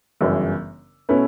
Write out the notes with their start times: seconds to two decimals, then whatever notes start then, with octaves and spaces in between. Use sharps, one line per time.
0.21 G1 F#2 C#3 E3
1.09 B2 A3 C#4 E4 B4